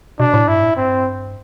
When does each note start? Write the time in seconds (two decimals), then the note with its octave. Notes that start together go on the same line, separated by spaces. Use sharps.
0.19 B2 D4
0.34 A2
0.48 G2 E4
0.62 A2
0.76 G2 C4